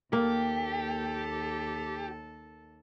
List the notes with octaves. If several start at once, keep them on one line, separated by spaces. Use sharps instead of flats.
D#2 A#3 G4 A4